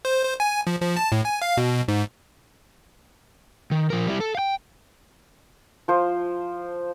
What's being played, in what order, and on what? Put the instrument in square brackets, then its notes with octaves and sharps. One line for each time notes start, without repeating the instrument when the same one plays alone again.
[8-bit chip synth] C5
C5
G#5
F3
F3
A5
A2
G#5
F5
B2
G#2
[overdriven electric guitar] D#3
F3 A#4
G3 E4
A4
F5 G5
[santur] F3 C5